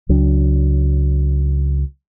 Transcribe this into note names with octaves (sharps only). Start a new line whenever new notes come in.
C#2 F#3 D4